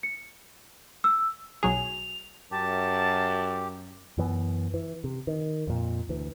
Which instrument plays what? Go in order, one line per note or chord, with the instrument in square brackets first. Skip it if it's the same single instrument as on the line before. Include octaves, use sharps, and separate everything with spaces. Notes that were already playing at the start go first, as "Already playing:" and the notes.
[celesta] C#7
E6
[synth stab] B1 F#3 G#4 [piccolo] F7
[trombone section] F#2 [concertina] G4 [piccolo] A5
[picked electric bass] F#2 E3 B3
E3
C3
D#3
F2 A#2
D2 E3